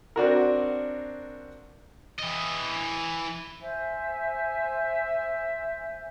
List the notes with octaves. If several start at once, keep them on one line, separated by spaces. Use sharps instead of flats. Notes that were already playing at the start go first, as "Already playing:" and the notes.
C4 D4 F#4 A#4
E3 D#5
C5 E5 G#5